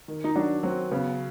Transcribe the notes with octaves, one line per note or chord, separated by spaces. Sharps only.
D#3
D#4
F#3 D4
F#3 C4
C#3 B3